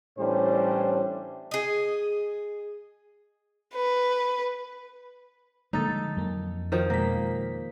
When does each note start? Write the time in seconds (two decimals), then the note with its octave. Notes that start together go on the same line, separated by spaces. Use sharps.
0.17 A2 E3 G3 C#4 D4 C5
1.51 G#4 D#5
3.74 B4
5.73 D3 F3 G3 G#3 A#3 D#4 A4 A6
6.17 F2 F#3 A#3
6.72 D#3 F3 F#4 D#5 A#5
6.90 B2 G#3 A#3 B6